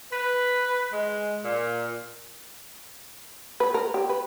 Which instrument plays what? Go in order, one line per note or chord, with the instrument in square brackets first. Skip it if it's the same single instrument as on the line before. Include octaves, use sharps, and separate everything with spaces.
[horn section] B4
G#3
A#2
[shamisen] B4
A#4
G4
B4